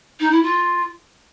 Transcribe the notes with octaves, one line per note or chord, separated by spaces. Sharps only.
D#4
E4
F4